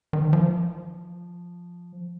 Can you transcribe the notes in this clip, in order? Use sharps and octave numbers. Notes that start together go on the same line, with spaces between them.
D#3
F3